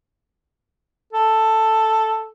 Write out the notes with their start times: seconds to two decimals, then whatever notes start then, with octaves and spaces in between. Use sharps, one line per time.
1.13 A4